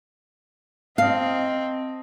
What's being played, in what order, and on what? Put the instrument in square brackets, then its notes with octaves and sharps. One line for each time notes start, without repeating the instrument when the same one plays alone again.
[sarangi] C4 [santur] D#5 A5 [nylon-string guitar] F5